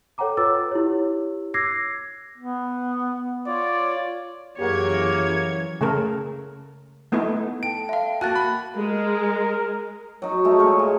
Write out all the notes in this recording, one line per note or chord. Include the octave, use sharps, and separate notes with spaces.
A4 C#5 F#5 G5 A#5 D6
F4 B4 D6 E6 A6
E4 G4 C#5
D6 E6 F#6 G#6 A#6 C7
B3
F4 C#5 D5
F#2 E3 A#3 G4 G#4 C#5 F#5 G#6
C#3 A3 A4 A#4
A3 B3 D#4 E4
A4 G5 A5 D7
E5 F5
A#3 F#4 A5 F#6 A6
B5
G#3 A#4
F#3 D#4
G#3 A3 D#4
A#2 A#4 C#6
G#3